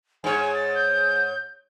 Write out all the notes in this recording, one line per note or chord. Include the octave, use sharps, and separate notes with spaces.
G#2 C#5 G#5
A6
G6